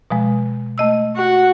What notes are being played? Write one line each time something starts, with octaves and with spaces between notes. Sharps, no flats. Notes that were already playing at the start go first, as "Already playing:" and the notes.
B2 F3 G#3
A3 D#5 E6
F#4